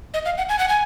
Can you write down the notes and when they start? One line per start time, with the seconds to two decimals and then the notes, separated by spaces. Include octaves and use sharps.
0.14 D#5
0.25 F5
0.38 F#5
0.49 G#5
0.59 F#5
0.69 G#5